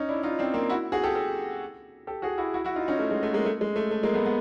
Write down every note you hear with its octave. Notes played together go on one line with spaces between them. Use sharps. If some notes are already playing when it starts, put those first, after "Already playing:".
Already playing: C#4 D#4
D4 E4
D#4 F4
C4 D4
A#3 C4
E4 F#4
F#4 G#4
G4 A4
G4 A4
G4 A4
F#4 G#4
E4 F#4
E4 F#4
E4 F#4
D#4 F4
C#4 D#4
A3
G#3
A3
G#3 A#3
A3
G#3
A3
A3
G#3 A#3
A3 B3
B3